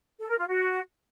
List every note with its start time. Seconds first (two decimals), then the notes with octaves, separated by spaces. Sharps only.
0.20 A4
0.29 A#4
0.38 F4
0.47 F#4